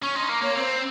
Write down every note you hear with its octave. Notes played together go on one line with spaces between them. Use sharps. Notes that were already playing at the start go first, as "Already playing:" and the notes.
C#4 C#6
D#4 C6
A#3 A#5
A#3 C#5
C4 C5 C#5